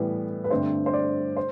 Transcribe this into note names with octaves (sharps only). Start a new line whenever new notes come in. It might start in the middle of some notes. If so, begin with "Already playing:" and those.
Already playing: A2 E3 G3 B3 B4
B4
G2 D3 A3 C4 C5
C5
D5
C5